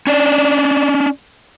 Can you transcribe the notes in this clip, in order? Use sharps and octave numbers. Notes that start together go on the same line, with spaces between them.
C#4 D4 D5